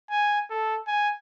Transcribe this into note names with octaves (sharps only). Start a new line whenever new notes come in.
G#5
A4
G#5